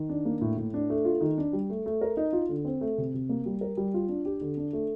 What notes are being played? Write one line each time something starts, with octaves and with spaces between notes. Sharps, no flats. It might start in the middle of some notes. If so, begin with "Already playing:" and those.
Already playing: D#3
D4
A#3
A2
A2
D4
A3
F4
D#3
D4
G3
A3
A3
A#4
D#4
F4
D3
C4
A3
C3
C3
A#3
G3
A#4
G3
F4
D4
G4
D3
D4
A3